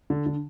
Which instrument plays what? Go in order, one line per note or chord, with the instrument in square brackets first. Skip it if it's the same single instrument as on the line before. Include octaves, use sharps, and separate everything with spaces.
[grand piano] D3
D3